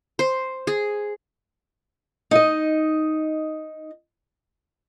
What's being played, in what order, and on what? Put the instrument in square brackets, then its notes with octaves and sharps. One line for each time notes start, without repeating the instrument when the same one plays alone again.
[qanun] C5
G#4
[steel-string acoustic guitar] D#4 D#5